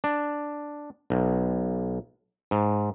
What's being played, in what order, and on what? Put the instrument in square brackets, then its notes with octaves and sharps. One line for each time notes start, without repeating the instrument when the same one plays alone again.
[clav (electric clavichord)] D4
B1
G#2